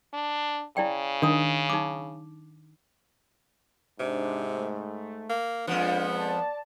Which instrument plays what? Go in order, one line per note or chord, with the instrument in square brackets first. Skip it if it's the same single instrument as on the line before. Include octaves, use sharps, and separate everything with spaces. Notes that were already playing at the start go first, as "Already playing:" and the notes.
[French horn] D4
[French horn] C#3 [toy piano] E4 D5 G5
[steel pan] D#3 [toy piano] D4 D#6
[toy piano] D#4 D6
[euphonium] G#2 [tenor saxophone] C3 [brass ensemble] D4
[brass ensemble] A3
[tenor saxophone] A#3
[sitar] F2 B2 F3 [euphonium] G#3 [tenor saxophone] B3 [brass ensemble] D4 F4
[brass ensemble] D5 A5